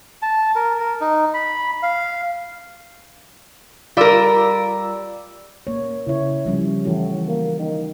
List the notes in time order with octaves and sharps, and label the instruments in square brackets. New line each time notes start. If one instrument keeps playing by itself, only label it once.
[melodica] A5
A#4
A#4
D#4
B5
F5
[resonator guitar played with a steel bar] G3 A#4 [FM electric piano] F4 D5 E6
[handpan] A#3 C#5
[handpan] C#3 C#5 [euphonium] E4
[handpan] F3 G3 C#4
[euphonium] A2 [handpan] E3 F#4
[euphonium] A#3
D#3